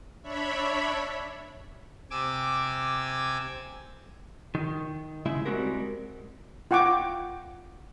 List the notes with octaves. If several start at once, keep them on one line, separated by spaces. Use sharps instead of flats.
D4 C#5 E5 B5
C3 G#5 D6 E6
D#3
C#3 G#3 E4 E5
G3 G#3 C4 F#4 G4 A#4
F4 F#5 G5 C#6 D6